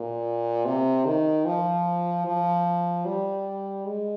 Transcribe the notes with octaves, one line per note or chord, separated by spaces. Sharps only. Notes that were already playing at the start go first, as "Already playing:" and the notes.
Already playing: A#2
C3
D#3
F3
F3
G3
G#3